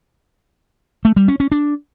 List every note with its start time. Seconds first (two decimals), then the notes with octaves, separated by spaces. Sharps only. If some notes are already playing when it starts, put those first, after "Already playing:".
1.05 A3
1.16 G3
1.28 C#4
1.40 C#4
1.52 D4